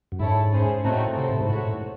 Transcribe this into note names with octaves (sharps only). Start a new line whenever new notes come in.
F#2
G#2 E4 A4 C#5
C#4 G#4 C5
A2 A3 C4 D#4 F#4 C#5
C3 E4 A4 C5
A2
G#2
A2 F#4 C#5 E5